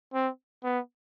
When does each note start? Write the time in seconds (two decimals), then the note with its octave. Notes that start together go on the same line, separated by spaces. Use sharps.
0.14 C4
0.64 B3